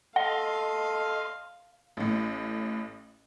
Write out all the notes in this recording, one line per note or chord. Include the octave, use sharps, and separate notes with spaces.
A4 D#5 F5 F#5 C6
A1 A2